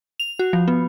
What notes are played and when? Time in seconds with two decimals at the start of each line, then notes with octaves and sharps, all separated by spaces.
0.20 F7
0.39 F#4
0.53 F3
0.68 B3